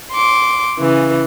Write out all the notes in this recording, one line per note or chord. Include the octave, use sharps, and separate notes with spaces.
C6 D6
C#3 E3